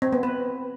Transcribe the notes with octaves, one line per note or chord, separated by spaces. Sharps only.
C4
B3
B4